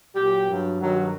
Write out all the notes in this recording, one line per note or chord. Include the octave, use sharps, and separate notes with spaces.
A#2 F#3 G4
G2 F#3
G2 D#3 F#3